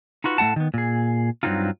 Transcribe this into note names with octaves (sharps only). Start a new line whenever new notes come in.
D#4 F4 F#4 B4
A2 A3 E4 F#5 A5
D#3 B3
A#2 G#4
G2 F3 F#3 C4 D#4 F4